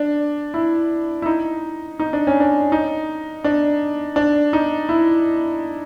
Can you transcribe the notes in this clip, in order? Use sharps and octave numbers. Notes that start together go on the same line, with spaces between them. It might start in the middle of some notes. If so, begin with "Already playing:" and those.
Already playing: D4
E4
E4
D#4
D#4
D4
C#4
D4
D#4
D4
D4
D#4
E4